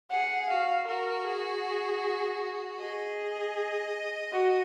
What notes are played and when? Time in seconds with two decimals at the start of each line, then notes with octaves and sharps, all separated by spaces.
0.10 G#4 F#5
0.50 F#4 F5
0.87 F#4 A#4
1.26 G#4
2.79 G#4 D#5
4.33 F#4